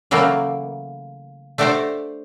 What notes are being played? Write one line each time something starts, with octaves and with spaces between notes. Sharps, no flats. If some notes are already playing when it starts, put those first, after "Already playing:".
C#3 E3 F#3 A3 A#3
A3 D4 F#4 G4 C5 D5